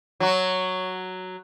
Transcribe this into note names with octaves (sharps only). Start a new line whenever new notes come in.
F#3 F#4